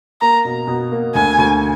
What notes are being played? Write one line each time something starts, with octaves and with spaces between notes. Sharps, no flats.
A#3 A#5
B2
B2
A#3
D2 G#5
D2